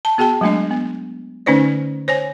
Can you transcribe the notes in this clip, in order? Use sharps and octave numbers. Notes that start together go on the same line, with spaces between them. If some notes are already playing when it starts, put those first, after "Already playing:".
A5
B3 F#4 G#4 G5 A5
F#3 G#3 A3 D4 D#5
B3
D3 A3 C#4 D#4 C5 D5
C5 C#5 G#5